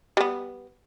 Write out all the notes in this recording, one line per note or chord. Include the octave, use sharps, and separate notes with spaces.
G3 B3